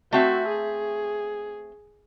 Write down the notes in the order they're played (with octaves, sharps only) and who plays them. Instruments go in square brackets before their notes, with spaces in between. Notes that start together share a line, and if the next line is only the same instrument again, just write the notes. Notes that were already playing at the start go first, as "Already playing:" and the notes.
[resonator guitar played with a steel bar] A3 C4 E5 [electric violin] F#4
[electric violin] G#4